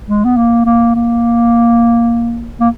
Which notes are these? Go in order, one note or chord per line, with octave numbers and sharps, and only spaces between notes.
G#3
B3
A#3
A#3
A#3
A#3